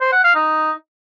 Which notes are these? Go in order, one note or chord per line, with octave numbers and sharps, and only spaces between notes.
C5
F#5
F5
D#4